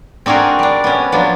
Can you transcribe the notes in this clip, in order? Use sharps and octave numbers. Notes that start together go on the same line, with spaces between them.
C4 D4 F#4 G#4 A#4
G3 D4
B3 C#4
F3 F#3 B3 D4